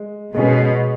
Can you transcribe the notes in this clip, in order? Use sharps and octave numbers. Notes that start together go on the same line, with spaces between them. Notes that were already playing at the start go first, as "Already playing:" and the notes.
Already playing: G#3
B2 G#3 C#4 G#4